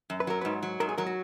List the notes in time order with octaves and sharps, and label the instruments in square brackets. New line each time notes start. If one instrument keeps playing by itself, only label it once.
[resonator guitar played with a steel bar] F#2
[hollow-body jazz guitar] B4
[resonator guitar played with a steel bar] F#3 [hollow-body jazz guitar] A#4
[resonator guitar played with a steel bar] G#2 [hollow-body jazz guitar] B4
[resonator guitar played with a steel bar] F#3
[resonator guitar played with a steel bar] G#2 [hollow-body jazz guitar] A#4
[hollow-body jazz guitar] G#4
[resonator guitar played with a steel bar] F#3 [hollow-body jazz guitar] A#4
[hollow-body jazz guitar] F#4